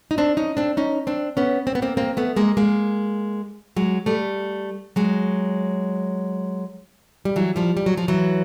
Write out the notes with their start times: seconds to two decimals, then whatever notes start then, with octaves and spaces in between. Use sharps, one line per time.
0.11 D#4
0.18 C4 D4
0.37 C#4 D#4
0.57 C4 D4
0.77 C#4 D#4
1.07 C4 D4
1.37 B3 C#4
1.67 C4
1.75 B3
1.82 A#3 C4
1.97 A#3 C4
2.17 A3 B3
2.36 G#3 A#3
2.57 G#3 A#3
3.76 F#3 G#3
4.06 G3 A3
4.96 F#3 G#3
7.25 G3
7.36 E3 F#3
7.56 F3 G3
7.77 G3
7.86 F#3
7.97 F3
8.08 E3 F#3